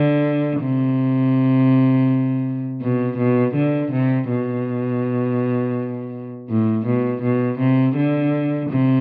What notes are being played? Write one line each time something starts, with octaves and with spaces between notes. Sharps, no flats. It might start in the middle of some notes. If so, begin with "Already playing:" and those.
Already playing: D3
C3
B2
B2
D3
C3
B2
A2
B2
B2
C3
D3
C3